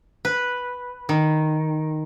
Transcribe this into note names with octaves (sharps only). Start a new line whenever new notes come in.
B4
D#3